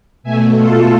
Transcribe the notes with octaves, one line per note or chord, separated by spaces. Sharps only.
B2 A3 E5 G#5
F4 A4